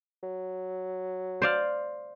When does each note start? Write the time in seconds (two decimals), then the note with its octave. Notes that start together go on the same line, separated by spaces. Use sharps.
0.23 F#3
1.42 C5 D5 F5